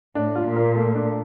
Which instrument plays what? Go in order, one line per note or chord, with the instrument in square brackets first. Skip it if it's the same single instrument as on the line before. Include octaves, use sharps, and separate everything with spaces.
[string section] A2 [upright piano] D4
[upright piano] F4
[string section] A#2
[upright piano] A#4
A3
D4